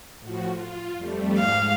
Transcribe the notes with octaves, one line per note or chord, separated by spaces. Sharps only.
A2 F3 F#4
F4
F2 G3 A3
G#2 F5